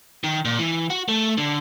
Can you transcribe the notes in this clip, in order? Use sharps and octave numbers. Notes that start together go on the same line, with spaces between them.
D#3
A#2
E3
F#4
A3
D3